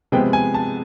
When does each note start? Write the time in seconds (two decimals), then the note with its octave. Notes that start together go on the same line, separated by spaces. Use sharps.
0.12 C3 F3 G#3 B3 G5
0.33 G#5
0.54 A5